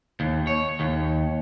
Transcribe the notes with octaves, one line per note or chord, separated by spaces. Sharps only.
D#2
C#5
D#2